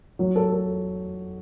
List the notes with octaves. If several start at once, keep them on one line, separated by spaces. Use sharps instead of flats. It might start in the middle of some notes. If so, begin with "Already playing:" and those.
F#3
A4
A4